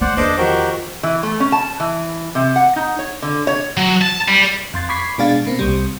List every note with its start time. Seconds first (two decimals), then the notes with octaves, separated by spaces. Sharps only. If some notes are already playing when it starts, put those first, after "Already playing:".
0.01 A#3 C5 D5 F#5
0.17 E2 D4 A4 B4 C5 D#5 D6
0.37 D#3 F3 F#4 G4 A#4
1.03 E3
1.23 A3
1.40 C#4
1.52 A5
1.80 E3
2.35 C3
2.56 F#5
2.76 D#4
2.99 C#5
3.22 D3
3.47 C#5
3.77 F#3
4.01 A5
4.28 G3
4.74 F2 C6 A6
4.89 B5 C#6 D6 G#6 B6 C7
5.18 B2 G#3 D4 G#4 F5 A6
5.46 B2 A#3 C4
5.59 C2 C3 G3